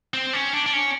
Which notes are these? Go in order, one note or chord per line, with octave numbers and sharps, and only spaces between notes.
C4
C#4
D4
D4
C#4